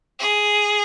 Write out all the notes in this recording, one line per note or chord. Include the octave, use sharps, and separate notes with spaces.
G#4